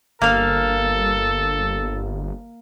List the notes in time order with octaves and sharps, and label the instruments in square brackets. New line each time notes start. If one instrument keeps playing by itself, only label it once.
[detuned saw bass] G1 [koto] A#3 F5 [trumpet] A4